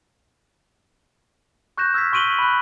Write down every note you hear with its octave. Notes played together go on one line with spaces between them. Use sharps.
C#6 F#6 G6 A#6 E7
E6 F6 G#6 B6
C6 C#6 D7 D#7 F#7 G7
B5 F#6